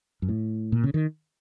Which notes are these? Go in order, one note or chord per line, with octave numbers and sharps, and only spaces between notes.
F#2
A2
A#2
C#3
D#3